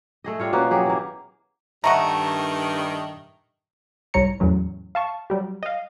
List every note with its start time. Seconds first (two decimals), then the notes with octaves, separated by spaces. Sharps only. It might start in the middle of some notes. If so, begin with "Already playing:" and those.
0.24 A3 G#4 D#5
0.39 G3 G#3 F4 C#5
0.53 B2 A#3 B3 C#4
0.71 F#3 G4 G#4
0.86 E3 A#3
1.84 G2 D#3 A3 D#5 F#5 A#5 C#6
4.14 C2 G#2 G3 C#5 A#5 C#7
4.40 E2 A2 F#3 C#4
4.95 F5 A5 C#6
5.30 F#3 G3 G4
5.63 D#5 F5